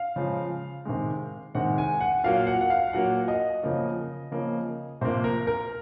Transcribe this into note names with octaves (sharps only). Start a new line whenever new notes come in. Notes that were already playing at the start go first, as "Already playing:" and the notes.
Already playing: F5
C#3 F3 G#3
C3 D#3 G#3
C3 D#3 G#3 F#5
G#5
F#5
A#2 F#3 A#3 F5
F#5
F#5
F5
A#2 F#3 A#3 F#5
D#5
C#3 F3 A#3
C#3 F3 A#3
C3 F3 A#3 C5
A#4
A#4